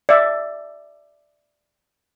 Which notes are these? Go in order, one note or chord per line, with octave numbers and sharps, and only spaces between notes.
D5 E5